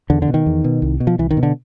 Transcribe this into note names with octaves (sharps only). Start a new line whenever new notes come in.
E2 D3
D3
B2
D#3
E2
B2
C2
B2
F3
C2 E3
D#3
B2
D3